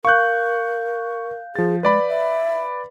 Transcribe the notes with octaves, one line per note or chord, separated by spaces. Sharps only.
A#4 F5 C#6 F#6 G6
F3 G#4 A6
G#3 B4 D5 B5
E5